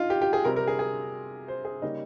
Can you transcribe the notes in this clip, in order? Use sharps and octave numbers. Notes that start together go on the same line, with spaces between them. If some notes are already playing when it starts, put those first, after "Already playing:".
Already playing: D#4 F4
G4
G4
G#4
C3 G3 C4 A#4
A#4
G#4
G#4
C5
G#4
C#3 G3 A#3 C#4 D#4